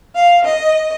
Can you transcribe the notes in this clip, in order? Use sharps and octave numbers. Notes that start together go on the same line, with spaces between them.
F5
D#5